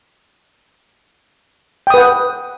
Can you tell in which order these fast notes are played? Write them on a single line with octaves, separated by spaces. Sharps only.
G5 D#6 B4 F#5